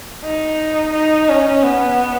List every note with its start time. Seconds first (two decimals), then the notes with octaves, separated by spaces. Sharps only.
0.24 D#4
0.93 D#4
1.29 C#4
1.63 B3